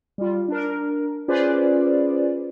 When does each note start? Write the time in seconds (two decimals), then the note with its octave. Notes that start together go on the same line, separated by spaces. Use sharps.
0.18 G3 F4
0.48 D4 A#4
1.28 C#4 F4 G#4 B4 C5 D5